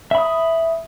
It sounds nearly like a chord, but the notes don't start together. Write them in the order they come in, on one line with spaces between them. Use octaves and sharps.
E5 B5 D#6